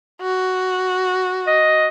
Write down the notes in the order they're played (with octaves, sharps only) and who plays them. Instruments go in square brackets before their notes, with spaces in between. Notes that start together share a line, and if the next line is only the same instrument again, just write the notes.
[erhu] F#4
[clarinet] D#5